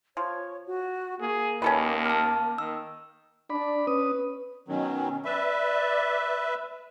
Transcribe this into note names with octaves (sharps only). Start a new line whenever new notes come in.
F3 C#5
F#4
A#3 G#4
D#2 C#4 A4 B4
A5 F6
D#3 E6
D4 D5 B5
C#4 B4 D#6
B2 D#3 F#3 C#4
B4 D5 E5